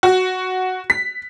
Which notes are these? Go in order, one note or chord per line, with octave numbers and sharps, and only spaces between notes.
F#4
B6